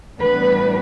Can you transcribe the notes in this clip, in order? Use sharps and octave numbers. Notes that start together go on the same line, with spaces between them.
A2 E3 G3 B3 D4 B4